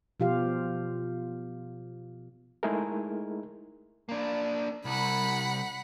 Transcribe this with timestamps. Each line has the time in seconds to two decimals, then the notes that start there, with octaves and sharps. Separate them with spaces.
0.20 B2 F3 F4 G4 F5
2.63 G#3 A3 D#4 E4 G#4 A#4
4.09 A#3 D4
4.85 C2 F#5 B5